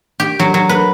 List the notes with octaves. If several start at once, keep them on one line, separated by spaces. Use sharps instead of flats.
G4
F#3
F#3
B4